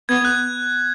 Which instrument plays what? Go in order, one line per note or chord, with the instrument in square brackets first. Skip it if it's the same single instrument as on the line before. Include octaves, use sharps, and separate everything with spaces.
[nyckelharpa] B3 [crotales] G#6
[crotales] F#6